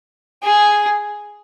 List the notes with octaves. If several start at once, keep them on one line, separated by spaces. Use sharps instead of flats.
G#4